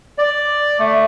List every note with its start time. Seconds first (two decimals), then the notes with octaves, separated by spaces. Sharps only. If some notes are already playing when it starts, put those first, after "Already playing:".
0.18 D5
0.79 A3